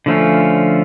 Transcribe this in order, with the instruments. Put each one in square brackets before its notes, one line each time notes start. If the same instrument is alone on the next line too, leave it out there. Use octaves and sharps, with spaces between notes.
[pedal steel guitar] D3 F3 A3 C#4 F4